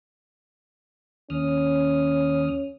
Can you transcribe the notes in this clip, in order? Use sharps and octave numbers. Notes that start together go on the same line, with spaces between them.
D#2 C#4 D#6 F6